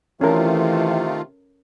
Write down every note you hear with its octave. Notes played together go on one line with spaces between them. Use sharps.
C3 D#3 E3 A3 C#4 F4 A4 A#4